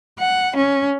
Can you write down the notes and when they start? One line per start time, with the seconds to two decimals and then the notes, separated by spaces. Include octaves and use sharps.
0.19 F#5
0.56 C#4